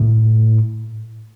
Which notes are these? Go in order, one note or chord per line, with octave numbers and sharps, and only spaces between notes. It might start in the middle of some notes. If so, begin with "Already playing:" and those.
Already playing: A2